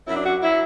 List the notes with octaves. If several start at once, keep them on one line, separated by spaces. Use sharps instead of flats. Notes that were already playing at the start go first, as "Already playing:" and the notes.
F#2 F#3 E4
D4
F#4
F#3 E4